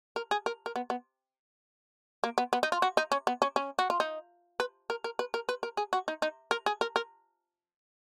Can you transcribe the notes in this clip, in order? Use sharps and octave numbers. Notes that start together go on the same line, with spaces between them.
A#4
G#4
A#4
A#4
B3
B3
A#3
B3
B3
D#4
F4
F#4
D#4
C#4
B3
C#4
C#4
F#4
F4
D#4
B4
A#4
A#4
B4
A#4
B4
A#4
G#4
F#4
D#4
D#4
A#4
G#4
A#4
A#4